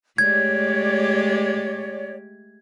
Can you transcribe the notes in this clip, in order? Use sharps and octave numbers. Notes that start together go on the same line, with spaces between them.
G#3 A3 G4 C#5 D5 G#6